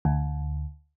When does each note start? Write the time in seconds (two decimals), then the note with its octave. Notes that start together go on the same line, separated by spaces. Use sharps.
0.05 D2